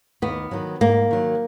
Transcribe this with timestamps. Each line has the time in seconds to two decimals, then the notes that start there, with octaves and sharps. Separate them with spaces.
0.22 D#2 B3
0.51 D#3 F#3
0.81 G#2 A#3
1.11 D#3 F#3